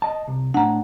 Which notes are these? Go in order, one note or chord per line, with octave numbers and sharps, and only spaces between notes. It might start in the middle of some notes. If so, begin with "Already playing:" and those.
D#5 A5
C2
A2 D4 F#5 A#5